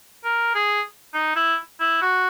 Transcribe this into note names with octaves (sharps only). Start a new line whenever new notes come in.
A#4
G#4
D#4
E4
E4
F#4